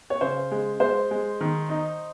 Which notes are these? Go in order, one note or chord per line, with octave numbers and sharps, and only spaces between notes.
C#5
C#3 C5
G#3
G#3 C5
G#3
D#3
D#4